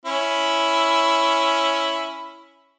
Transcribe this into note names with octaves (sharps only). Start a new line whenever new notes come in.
C#4 E4